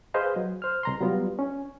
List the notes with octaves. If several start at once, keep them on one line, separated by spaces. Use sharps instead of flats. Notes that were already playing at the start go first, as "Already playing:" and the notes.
G#4 B4 C5 D#5 F5
F#3
C5 F6
C2 A#5 C6
F#3 G3 B3 F4
C#4